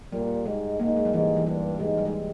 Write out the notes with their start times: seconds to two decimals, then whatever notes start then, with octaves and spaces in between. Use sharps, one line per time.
0.12 A#2 G3
0.46 G#2 G#3
0.80 G#2 A#3
0.88 D#4
0.96 G#3
1.05 G3
1.14 G#2 E3
1.37 E3
1.46 G2 G3
1.80 G#2 G#3
1.97 G3
2.05 G#3